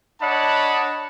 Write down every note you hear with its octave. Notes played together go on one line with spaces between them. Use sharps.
D4 C#5 D#5 F#5 A5 B5